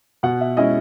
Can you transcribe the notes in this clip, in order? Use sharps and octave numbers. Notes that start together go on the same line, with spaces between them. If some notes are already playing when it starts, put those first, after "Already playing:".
B2 F#5
E5
G#3 C#4 E4 D#5